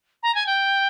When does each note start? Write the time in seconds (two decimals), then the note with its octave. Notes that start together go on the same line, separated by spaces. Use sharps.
0.23 A#5
0.35 G#5
0.46 G5